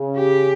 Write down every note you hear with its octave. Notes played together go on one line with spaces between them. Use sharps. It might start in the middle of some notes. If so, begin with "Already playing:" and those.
Already playing: C#3
G4